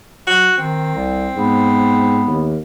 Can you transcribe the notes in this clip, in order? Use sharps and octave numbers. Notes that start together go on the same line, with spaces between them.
F#3 F#4
D#3 C4
C2
G#2 B3
D#2